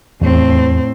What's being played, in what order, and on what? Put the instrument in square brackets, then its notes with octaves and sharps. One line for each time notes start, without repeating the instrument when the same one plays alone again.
[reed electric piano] E2 [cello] A2 C4